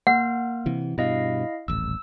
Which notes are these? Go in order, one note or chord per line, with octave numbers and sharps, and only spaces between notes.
A#3 F#5 F6
C3 E3
G2 B2 E4 D#5 F5
D#1 A1 E6